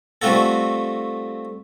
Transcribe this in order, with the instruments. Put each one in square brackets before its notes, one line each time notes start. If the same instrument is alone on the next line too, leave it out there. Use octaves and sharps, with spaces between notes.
[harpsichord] G3 A3 C4 F4 F#4 A4